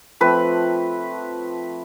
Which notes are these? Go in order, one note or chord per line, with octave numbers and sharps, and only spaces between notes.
F3 A3 C4 B4